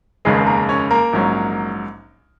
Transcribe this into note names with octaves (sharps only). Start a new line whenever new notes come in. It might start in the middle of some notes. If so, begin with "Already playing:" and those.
F1 D#2 C#3 G#3 G#4
A#3 A#4
C#4 C#5
A#3 A#4
A#1 G#2 F#3 C#4